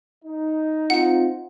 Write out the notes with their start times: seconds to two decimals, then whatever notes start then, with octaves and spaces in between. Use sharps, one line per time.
0.24 D#4
0.90 C4 F4 F#5